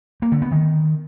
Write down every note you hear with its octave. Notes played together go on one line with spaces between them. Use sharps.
A#3
D3
B3
D#3